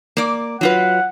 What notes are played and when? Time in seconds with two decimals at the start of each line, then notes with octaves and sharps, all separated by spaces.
0.17 A#3 D5
0.61 F#3 F4 B4 F#5